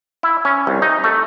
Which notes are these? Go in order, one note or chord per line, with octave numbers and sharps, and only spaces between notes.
E4
C#4
C2
D#4
A3